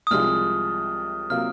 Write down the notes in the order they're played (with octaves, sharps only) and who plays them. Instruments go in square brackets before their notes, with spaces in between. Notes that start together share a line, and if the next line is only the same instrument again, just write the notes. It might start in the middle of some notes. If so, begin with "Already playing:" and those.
[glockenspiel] D#6
[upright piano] C2 C3 F3 G#3 [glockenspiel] F6
[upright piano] C3 F#3 A#3 F4 [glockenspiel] F6